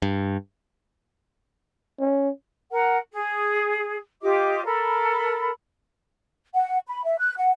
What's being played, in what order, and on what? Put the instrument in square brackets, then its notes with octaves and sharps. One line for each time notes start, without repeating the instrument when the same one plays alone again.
[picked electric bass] G2
[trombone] C#4
[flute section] A#4 F#5
G#4
F4 G4 D#5 D6
A4 A#4 B5
F#5
B5
E5
F#6
F#5